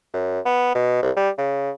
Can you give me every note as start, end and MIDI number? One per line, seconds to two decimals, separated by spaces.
0.14 0.40 42
0.45 0.72 59
0.75 0.99 47
1.02 1.11 36
1.16 1.29 55
1.38 1.71 49